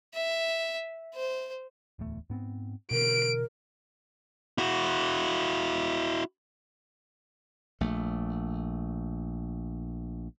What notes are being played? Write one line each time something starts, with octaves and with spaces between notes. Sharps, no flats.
E5
C5
D1 E2 A3
G#2 B3 C4
B2 D3 E3 A#4 D7
E4 F#4
A#1 A3